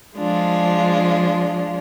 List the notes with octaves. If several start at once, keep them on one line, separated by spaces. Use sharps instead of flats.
F3 G#3 D4 F4